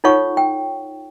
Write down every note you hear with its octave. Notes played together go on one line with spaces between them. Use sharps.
D#4 F4 A4 C#5 F#5 C#6
G5